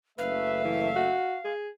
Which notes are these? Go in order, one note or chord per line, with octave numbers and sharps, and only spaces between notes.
F#1 A3 B4 E5 F5
E3
F#4
G#4